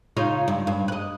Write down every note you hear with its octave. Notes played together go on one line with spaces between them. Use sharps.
C#3 D#4 F4
G2
G2
B4 D#5